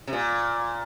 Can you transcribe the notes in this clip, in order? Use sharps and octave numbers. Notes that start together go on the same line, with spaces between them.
C3
A#2